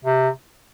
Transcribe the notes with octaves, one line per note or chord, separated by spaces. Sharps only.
C3